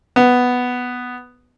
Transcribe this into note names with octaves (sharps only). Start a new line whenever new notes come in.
B3